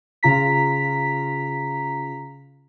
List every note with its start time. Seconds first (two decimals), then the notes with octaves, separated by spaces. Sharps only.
0.23 C#3 F4 A#5 B6